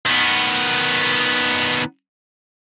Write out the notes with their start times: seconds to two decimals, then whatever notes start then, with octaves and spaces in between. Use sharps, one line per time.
0.06 D#3 B3